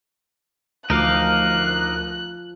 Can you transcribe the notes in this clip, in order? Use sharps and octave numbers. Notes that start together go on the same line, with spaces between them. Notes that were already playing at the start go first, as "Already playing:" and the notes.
D2 F3 D#4 A#4 F5 D6 F#6